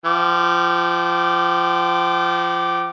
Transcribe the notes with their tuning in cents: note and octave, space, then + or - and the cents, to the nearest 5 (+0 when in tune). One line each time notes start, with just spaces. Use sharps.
F3 -20 G5 -35 D6 +0